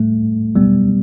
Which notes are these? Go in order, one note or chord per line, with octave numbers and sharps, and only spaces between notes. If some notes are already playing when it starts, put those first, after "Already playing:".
Already playing: A2 G3 A3
B2 F#3 G3 B3